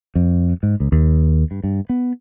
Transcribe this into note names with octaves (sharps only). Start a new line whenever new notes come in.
F2
G#2
C#2
D#2
G2
G2
B3